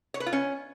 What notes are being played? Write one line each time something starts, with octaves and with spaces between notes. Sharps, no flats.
C#5
B4
F4
C#4